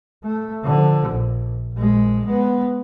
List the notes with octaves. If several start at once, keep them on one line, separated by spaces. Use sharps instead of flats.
A3
D3 F3
A#1
A#1 G#3
G#3 B3